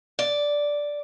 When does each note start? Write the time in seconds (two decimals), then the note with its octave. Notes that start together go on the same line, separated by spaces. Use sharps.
0.19 D5